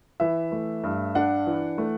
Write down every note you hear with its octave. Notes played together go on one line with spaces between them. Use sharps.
E3 E5
A3
G2
D4 F#5
E3
A3